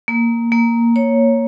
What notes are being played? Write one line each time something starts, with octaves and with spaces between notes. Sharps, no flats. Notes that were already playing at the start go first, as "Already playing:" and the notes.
A#3
A#3
C#5